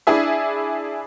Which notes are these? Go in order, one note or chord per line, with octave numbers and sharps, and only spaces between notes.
D4 E4 G#4 E5